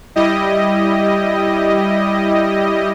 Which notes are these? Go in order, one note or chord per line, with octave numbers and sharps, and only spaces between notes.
G3 E4 G4 D#5